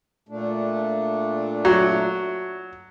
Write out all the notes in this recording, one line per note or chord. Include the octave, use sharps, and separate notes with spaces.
A#2 A3 D4
F#3